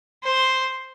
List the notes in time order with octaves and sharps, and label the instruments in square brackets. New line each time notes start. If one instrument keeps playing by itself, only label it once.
[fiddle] C5